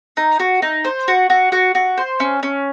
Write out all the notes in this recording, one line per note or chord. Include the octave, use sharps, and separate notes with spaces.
D#4
F#4
D#4
C5
F#4
F#4
F#4
F#4
C5
C#4
C#4